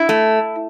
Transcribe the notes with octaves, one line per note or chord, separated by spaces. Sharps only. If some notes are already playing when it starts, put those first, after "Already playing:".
Already playing: E4
A3